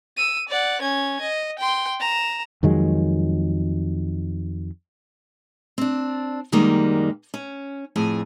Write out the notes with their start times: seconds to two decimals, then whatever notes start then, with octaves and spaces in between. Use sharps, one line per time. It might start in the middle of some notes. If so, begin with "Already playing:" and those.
0.17 E6 D#7
0.49 D5 F#5
0.82 C#4 G#6
1.21 D#5
1.59 G5 C6
2.00 A#5 E7
2.63 F2 D#3 F#3 G#3
5.78 C4 D4
6.52 F#2 D#3 G3 G#3 A#3
7.34 C#4
7.96 F2 A2 G#4 G#5